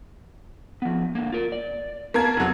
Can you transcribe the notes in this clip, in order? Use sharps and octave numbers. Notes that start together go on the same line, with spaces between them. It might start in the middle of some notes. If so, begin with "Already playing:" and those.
F3 B3
D3 A#3
F4 A#4
D5
A#3 B3 A#4 A5 G#6
F1 F#3